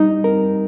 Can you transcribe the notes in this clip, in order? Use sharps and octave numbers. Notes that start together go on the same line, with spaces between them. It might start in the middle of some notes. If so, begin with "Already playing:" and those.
Already playing: G3 D#4
C4 A#4